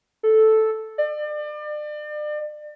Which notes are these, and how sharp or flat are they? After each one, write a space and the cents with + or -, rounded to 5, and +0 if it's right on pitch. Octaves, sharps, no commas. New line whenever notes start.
A4 -5
D5 +35